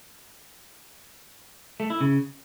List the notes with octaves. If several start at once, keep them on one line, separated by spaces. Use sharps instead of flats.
A3
E4
C#3